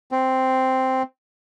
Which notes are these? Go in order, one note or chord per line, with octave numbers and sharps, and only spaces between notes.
C4